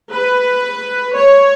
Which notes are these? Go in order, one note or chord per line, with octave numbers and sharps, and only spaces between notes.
B4
C#5